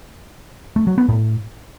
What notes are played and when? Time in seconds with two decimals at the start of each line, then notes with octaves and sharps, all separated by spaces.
0.76 A3
0.87 F#3
0.98 B3
1.09 A2